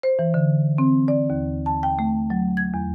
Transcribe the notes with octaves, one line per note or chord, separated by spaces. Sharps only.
C5
E3
D3
C4
D5
D#2
A5
G5
A3
F#3
G#6
E2